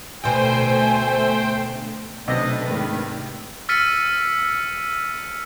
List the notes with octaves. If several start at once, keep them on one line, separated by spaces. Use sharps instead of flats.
D2 B2 A3 C5 G5 G#5
B1 C3 A3 D4 B4 D#5
G#2 D#3
E6 F6 A6 B6 C#7 D#7